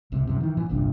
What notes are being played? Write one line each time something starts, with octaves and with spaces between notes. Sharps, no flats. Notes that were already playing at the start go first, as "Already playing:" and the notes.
D1 C#2 C3
F#2 C3
D#3 E3
A#2 E3
G1 C2 A#2 D4